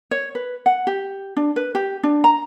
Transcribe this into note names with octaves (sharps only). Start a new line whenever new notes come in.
C#5
B4
F#5
G4
D4
B4
G4
D4
A#5